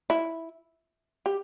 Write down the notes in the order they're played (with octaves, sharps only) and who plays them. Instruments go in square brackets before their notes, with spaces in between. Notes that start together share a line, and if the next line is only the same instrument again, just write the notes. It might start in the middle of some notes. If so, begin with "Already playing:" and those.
[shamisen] E4
G4